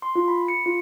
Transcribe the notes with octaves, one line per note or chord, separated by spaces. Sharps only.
C6
F4
B5
C#7
F4